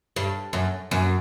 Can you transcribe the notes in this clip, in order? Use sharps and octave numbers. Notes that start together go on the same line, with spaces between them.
G2
F#2
F#2